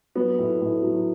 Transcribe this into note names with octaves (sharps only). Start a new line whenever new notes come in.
F#3 B3
A2
A2
F#3